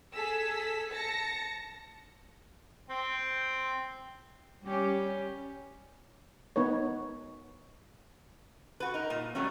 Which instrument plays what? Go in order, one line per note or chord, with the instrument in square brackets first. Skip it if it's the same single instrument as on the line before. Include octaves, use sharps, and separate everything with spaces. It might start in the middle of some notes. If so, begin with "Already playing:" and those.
[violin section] G#4 A4 E6 B6
A5 A#6 C#7
[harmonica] C4 G5
[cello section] G3 C#4 G4
[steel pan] B3 D#4 B4 C#5
[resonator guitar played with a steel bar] F#4 B4
D#4 A#4
A#2
F#3 G3 A3 C#4